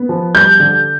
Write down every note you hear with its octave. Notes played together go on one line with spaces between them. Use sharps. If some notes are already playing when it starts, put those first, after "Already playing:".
Already playing: B3
F3
G3 G6
D3